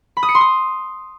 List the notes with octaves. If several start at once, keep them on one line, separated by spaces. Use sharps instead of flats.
B5
D#6
C#7
C6
D#6